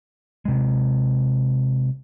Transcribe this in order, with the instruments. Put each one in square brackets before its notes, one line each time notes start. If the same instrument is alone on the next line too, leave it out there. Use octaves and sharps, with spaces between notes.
[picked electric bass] C3 G#3